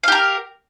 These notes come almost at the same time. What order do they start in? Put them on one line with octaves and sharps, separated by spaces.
F5 G4 A#4